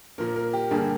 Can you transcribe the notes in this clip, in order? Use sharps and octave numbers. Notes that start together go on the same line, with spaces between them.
A#2 F3 A#3 A#4
A#4
G4
G2 D3 G3 A#3 G#4